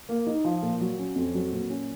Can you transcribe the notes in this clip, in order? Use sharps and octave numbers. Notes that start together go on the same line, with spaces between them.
A#3
D#4
F3
A#2
F#3
C#4
F2
F#3
A#2
C#4